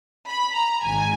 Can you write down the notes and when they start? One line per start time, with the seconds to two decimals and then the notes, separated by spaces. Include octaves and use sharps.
0.28 B5
0.55 A#5
0.84 G#1 G#2 G#5